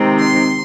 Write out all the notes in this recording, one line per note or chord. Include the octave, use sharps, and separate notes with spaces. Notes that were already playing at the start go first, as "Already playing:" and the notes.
Already playing: C3 D#3 G#3 C4 D#4
C6